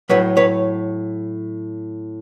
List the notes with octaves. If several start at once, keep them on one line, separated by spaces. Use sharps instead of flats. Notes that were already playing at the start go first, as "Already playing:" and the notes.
A2 F#3 B4 C#5
B4 C#5